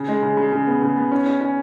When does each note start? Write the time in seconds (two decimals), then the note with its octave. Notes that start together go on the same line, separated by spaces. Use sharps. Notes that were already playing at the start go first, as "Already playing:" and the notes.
Already playing: C#3
0.08 G#3
0.22 C#3
0.37 C#3
0.52 C#3
0.67 B3
0.82 C#3
0.97 B3
1.12 C#4
1.26 C#4
1.41 C#4